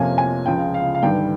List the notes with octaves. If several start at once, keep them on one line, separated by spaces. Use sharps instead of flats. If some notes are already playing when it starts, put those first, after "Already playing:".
Already playing: F2 C3 F3 A#3 C#4 G#5
G#5
C#2 C#3 F3 G#3 G5
F5
F5
G1 G2 D#3 G3 G5